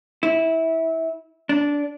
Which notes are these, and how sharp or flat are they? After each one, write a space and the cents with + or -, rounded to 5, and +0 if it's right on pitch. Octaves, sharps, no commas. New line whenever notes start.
E4 -20
D4 -15